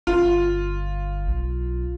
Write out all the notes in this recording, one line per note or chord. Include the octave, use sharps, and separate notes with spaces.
G1 F4
B1